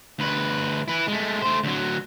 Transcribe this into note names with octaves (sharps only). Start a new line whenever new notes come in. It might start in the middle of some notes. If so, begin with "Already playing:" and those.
D2 B4
E4 B4
G#3 A3
A3 C5
D2 F#3